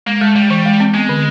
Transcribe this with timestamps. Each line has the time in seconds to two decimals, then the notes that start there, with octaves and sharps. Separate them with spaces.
0.06 G#3 A#3
0.21 G#3 A3
0.36 G3 G#3
0.50 E3 G3
0.66 G#3
0.80 C4
0.94 G#3 B3
1.09 D3